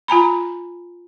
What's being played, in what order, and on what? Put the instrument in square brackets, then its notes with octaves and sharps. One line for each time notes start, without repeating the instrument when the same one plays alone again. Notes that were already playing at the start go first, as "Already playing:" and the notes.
[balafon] F4 G#5 A#5 B5